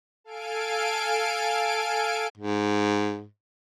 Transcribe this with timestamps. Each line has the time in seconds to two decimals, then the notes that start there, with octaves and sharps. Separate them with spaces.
0.24 A4 F5 G#5 D7
2.38 G#2